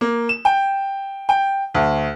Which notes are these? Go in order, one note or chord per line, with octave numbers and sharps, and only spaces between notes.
A#3
E7
G5
G5
D2